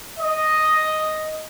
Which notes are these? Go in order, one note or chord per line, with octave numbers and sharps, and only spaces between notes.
D#5